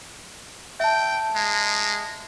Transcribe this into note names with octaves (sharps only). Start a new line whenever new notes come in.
E5 G5 A5
G#3